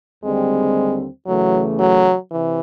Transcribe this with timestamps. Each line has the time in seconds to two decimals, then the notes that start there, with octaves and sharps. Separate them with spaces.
0.23 D#2 D3 G3 G#3 C4
1.27 E2 C#3 E3 F#3 A3
1.79 F#3
2.31 C3 E3